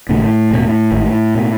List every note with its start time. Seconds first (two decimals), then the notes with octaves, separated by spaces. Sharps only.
0.09 G#1 F#2 A2 C#3 A3
0.51 E1 E2 B2
0.92 G#1 G#2
1.35 B2